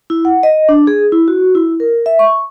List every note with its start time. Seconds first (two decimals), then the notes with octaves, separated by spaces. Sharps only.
0.10 E4
0.25 F#5
0.43 D#5
0.69 D4
0.87 G#4
1.12 E4
1.28 F#4
1.55 E4
1.80 A#4
2.06 E5
2.19 C#6